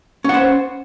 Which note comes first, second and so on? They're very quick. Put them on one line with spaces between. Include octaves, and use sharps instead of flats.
C#4 F#5 C5